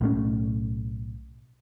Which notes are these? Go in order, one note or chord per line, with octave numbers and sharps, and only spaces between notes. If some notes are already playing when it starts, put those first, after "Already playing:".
B1 A2 A3 C#4